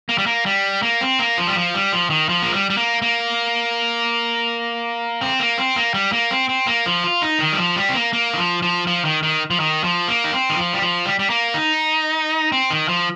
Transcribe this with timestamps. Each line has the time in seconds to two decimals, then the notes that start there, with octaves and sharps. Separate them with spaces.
0.09 A#3
0.18 G3
0.26 A#3
0.46 G3
0.83 A#3
1.01 C4
1.19 A#3
1.37 F3
1.47 G3
1.56 F3
1.74 G3
1.92 F3
2.10 D#3
2.29 F3
2.42 A#3
2.54 G3
2.70 G3
2.77 A#3
3.02 A#3
5.21 C4
5.40 A#3
5.58 C4
5.76 A#3
5.94 G3
6.12 A#3
6.31 C4
6.49 C4
6.67 A#3
6.86 F3
7.04 F4
7.22 D#4
7.40 D#3
7.53 G3
7.59 F3
7.76 G3
7.89 C4
7.95 A#3
8.13 A#3
8.34 D#3
8.37 F3
8.62 F3
8.87 F3
9.05 D#3
9.23 D#3
9.50 F3
9.60 D#3
9.84 F3
10.08 A#3
10.24 D#4
10.33 C4
10.50 D#3
10.57 F3
10.73 G3
10.82 F3
11.05 G3
11.19 G3
11.30 A#3
11.54 D#4
12.52 C4
12.71 D#3
12.89 F3